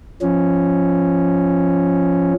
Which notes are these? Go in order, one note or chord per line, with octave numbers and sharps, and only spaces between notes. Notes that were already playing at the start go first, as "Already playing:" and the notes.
F3 C#4